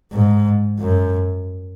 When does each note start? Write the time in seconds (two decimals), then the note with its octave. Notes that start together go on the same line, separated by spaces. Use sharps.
0.12 G#2
0.80 F#2